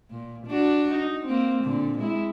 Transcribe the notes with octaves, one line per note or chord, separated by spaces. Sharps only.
A#2
D4 F#4
D#4
A#3 C4
A#2 D3
G#3 E4